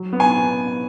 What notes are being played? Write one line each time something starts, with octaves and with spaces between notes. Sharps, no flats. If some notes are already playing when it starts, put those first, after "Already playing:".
Already playing: F#3
B3
G#5